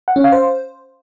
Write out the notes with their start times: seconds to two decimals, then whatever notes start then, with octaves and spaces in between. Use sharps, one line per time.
0.08 F#5
0.16 C#4
0.24 F5
0.32 C5